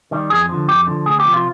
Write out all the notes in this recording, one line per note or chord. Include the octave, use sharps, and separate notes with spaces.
D#3 G3
F2 G#4
D3 F3
F2 G4
D3 F3
D2 G#4
G4
C3 F3
F4